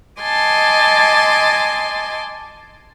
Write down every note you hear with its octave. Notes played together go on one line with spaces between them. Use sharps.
D#5 G#5 A5 C6 D6